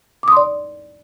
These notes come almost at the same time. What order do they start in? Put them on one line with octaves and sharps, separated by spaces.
D6 D#6 C6 D5